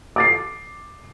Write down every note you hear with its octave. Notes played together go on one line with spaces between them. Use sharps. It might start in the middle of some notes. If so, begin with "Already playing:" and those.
D6 A6 C7